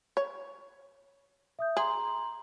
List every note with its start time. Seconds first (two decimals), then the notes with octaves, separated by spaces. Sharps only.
0.17 C#5
1.59 E5 D#6 G6
1.77 G#4 A#5 C6 F#7